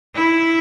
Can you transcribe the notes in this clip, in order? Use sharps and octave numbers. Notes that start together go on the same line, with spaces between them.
E4